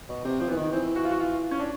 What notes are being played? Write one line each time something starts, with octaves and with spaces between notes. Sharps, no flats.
B2
C3 C4
F3 C4
E3 B3
D#3
E3 C4
F#4
F4
F#4
F4
C#4
D4